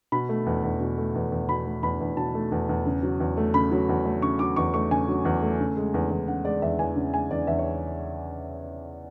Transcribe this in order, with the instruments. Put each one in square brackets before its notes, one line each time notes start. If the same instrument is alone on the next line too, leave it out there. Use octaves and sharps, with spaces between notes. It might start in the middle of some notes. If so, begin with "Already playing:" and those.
[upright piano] B2 B5
A3
E2
E2
B2
A3
E2
E2
B2 B5
A3
E2 B5
E2
B2 A5
A3
E2
E2
C#3
F#3
E2
A3
C#3 B5
F#3
E2
A3
C#3 C#6
F#3 D6
E2 C#6
A3 C#6
C#3 G#5
F#3
E2
A3
C#3
G#3
E2
E2
C#3 F#5
G#3 D5
E2 E5
E2 G#5
C#3
G#3 G#5
E2 D5
E2 E5
C#5